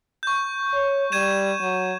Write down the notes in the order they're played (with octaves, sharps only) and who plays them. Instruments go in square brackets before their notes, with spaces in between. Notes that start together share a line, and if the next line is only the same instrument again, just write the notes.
[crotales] C#6 G6
[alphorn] C#5
[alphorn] G3 [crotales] G#6 D#7 E7
[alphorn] F#3